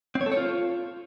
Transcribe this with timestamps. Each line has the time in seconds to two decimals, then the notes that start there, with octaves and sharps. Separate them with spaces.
0.15 C4
0.21 C#5
0.26 A4
0.32 C#5
0.37 F4